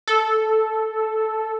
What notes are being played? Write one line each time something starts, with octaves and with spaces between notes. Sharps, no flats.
A4